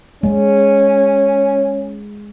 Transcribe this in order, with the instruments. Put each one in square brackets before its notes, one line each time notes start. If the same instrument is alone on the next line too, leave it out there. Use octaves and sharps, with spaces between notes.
[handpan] G#3 [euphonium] C#4